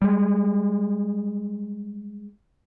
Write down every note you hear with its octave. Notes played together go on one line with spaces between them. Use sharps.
G3 G#3